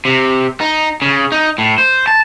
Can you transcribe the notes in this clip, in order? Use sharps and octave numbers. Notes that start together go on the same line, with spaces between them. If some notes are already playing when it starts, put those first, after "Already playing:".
C3
D#4
C#3
D#4
A2
C5
A5